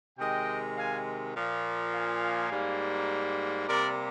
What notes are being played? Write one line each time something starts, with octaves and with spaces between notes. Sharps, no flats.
C3 D#3 G#3 D#5 G5
F5 G#5
A#2 F3 A#3
F5 G#5
G#2 G3 A#3
C3 G3 A#3 A#4 D5